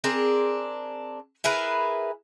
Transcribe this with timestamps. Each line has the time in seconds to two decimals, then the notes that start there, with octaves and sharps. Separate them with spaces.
0.04 C4 D4 G#4 A#4
1.44 E4 G#4 A#4 B4